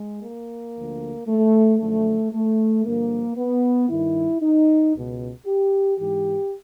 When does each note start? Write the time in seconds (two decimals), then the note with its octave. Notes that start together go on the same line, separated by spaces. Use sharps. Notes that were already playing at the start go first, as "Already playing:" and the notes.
Already playing: G#3
0.23 A#3
0.75 D2 D3 F3
1.28 A3
1.80 F#2 D3 F3 A3
2.33 A3
2.85 G2 D3 F3 A#3
3.37 B3
3.90 G2 D#3 E4
4.42 D#4
4.94 C#2 B2
5.46 G4
5.98 G#2 E3 G4